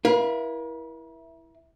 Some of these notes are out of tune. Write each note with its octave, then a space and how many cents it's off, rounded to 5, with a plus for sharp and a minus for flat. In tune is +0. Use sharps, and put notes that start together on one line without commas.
E4 +0 A#4 +45 F5 +0